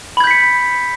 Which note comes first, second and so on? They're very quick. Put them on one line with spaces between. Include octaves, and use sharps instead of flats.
B5 G#6 G6 B6 C#7